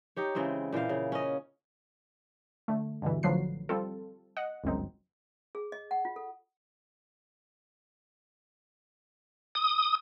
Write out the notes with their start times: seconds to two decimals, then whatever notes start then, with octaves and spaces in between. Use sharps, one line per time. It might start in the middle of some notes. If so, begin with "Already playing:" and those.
0.16 D#4 G4 C#5
0.35 C#3 E3 G#3 C4
0.73 A#2 E3 C5 F5
0.89 C#3
1.12 C#4 D#5
2.68 D3 A3
3.02 G2 B2 D3 E3
3.23 A1 D3 F3 F#3 B4 C7
3.69 G3 C4 F4 A4
4.37 D#5 F#5
4.64 G1 C#2 F#2 C4 D#4
5.55 G#4
5.72 D#5
5.91 F#5
6.05 F4
6.16 A4
9.55 D#6